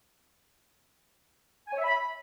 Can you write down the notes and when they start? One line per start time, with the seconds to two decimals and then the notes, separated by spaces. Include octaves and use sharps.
1.68 G#5
1.73 C#5
1.79 E5
1.84 B5